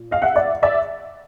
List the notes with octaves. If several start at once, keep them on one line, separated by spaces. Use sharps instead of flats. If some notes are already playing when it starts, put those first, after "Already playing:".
Already playing: A#2
D#5 F5
E5 F#5
D5 E5
D5 E5